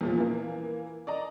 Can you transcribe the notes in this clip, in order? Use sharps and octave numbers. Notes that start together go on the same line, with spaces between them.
E2 A#2 F3
E3 A#3
D5 D#5 A#5